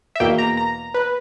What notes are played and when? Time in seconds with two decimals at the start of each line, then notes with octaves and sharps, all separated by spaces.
0.16 E5
0.20 E2 B2 A#3 G5
0.38 A#5
0.57 A#5
0.94 B4